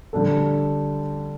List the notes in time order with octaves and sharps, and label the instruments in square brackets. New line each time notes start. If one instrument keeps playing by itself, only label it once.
[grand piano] D3 G3 D4 A4